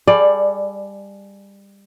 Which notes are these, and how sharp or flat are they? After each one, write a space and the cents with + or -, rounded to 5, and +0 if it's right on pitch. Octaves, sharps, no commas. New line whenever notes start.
G3 +25 G#4 +40 D5 +10